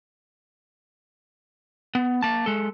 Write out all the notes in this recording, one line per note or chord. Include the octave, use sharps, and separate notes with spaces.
B3
A#3 A5
G#3 A4